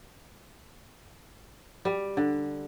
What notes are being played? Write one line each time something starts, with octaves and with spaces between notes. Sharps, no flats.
G3
D3